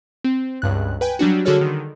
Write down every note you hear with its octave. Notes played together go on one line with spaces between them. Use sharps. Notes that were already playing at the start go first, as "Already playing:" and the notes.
C4
C#2 G2 F#6
B4 G5 G#5
F#3 G3 D4 F#4
D3 F#4 G#4 A4 C#5 F6
D3 D#3